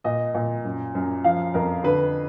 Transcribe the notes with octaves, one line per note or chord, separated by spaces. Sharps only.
A#2 D#5
A#2
F#2
F#2
F3 F5
F2 A#4
D3 B4